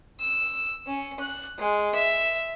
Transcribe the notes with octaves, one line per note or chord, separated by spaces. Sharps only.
E6
C#4
F#6
G#3
E5